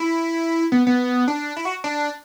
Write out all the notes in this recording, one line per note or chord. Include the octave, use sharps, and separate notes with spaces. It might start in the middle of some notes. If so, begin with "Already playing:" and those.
Already playing: E4
B3
B3
D4
E4
F#4
D4